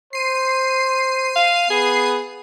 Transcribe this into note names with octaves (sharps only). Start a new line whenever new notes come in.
C5 C7 D#7
F5
B3 G#4